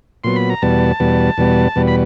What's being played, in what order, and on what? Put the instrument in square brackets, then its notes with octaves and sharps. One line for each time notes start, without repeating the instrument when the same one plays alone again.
[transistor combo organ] A#2 F#3 B3 C6
B5
A#5
E2 B2 G3 B3 A5
E2 B2 G3 B3
E2 B2 G3 B3
E2 B2 G3 B3
B5